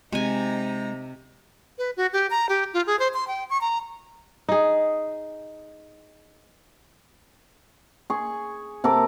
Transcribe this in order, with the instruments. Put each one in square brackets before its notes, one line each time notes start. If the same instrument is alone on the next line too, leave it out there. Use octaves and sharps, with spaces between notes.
[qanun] C3 G#5 [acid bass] G#3 [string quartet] D#4 A#5
[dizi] B4
F#4
G4
A#5
G4
F4
G#4
C5
C6
G5
C#6
A#5
[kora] D#4 G#4
[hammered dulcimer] G#4 C#6
C3 A4 A#4 D6